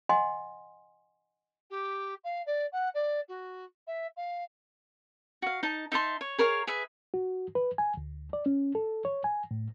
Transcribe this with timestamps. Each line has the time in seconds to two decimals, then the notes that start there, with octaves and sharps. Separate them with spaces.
0.09 D#5 F#5 G#5 C6
1.70 G4
2.24 F5
2.46 D5
2.72 F#5
2.94 D5
3.28 F#4
3.87 E5
4.16 F5
5.42 F#4 F5
5.63 D#4 A5
5.92 D#4 E5 A5 C6
6.21 C#5
6.38 G#4 A#4 C#5 F5
6.67 G#4 B4 E5
7.14 F#4
7.55 B4
7.78 G#5
7.97 D2
8.33 D5
8.46 C#4
8.75 A4
9.05 C#5
9.24 G#5
9.51 A2